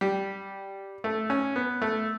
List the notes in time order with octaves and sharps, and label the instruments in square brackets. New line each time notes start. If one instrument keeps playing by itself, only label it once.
[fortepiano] G3
A3
C#4
B3
A3